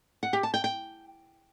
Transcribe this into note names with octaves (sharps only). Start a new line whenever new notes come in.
F#5
G4
A5
G5
G5